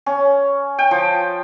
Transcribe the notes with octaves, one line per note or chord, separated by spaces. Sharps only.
C#4
G5
F3